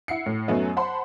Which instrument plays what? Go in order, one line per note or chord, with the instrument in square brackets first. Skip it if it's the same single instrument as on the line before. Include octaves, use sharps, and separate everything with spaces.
[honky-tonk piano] E4 F#5 C7 C#7
A2
F#2 F#3 A3 B3 D#4
C5 F#5 A5 B5 C6